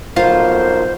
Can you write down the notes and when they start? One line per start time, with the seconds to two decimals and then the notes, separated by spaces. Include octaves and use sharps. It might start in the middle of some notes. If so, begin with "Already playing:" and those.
0.16 B1 F2 F4 A#4 C5